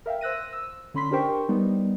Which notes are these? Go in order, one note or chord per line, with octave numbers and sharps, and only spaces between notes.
A#4 E5 F5 G5
C5 E6 F#6 A#6 D#7
E6
D3 C#4 B5 C6 B6
D4 G4 A#4 C5 G5 C#6
G3 B3 D#4